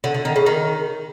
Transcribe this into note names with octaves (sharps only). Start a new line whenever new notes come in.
D3
D3
D#3
C#3
D#3